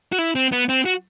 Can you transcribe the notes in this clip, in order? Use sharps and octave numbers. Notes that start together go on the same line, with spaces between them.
F#4
E4
C4
B3
C4
F#4